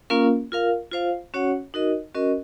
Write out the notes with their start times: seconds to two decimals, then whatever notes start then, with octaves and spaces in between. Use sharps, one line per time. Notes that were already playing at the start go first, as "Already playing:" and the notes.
0.10 A#3 C#4 F4 A#4 F5
0.52 F4 A#4 F5
0.92 F4 C5 F5
1.34 C#4 F#4 C#5 F#5
1.74 D#4 F#4 A#4 D#5
2.14 C#4 F#4 A#4 D#5